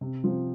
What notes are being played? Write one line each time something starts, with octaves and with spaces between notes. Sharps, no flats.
C3
F3 C4